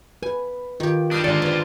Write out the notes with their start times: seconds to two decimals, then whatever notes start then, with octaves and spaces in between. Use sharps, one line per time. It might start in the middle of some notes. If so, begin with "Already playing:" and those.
0.23 B4 G#5
0.80 D#3 F4 G4
1.11 G3 D4 D#6 F6 C7
1.24 G#2 D3 D#3 D4 F4 A4 D5
1.42 B4 D5